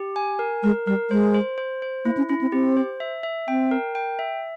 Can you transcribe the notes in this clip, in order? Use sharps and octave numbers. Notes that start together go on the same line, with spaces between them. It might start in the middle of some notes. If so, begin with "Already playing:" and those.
Already playing: G4
G#5
A#4
G#3 A#4
G3 A#4
G#3 C5
C5
C5
C5
A#3 E4
C#4
C#4 E4
C4
C4 G4
C5
E5
E5
C4 G5
A#4
G5
E5